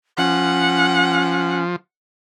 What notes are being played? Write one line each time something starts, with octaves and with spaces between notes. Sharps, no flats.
F3 C#4 F#5